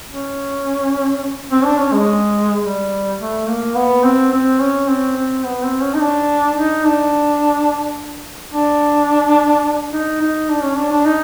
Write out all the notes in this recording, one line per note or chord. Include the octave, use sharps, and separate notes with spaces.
C#4
C4
D4
C#4
G#3
G3
A3
A#3
B3
C4
C4
C#4
C4
C4
B3
C4
C#4
D#4
D4
D#4
D4
D4
D#4
D#4
D4
C#4
D4
D4
D#4